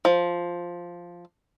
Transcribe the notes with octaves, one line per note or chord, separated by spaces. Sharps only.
F3